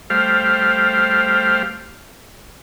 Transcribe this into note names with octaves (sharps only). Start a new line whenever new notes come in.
G3 A3 G4 C5 F5 F6